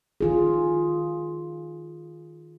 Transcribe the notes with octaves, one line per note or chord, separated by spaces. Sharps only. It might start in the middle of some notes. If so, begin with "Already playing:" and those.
D#3 F4 G#4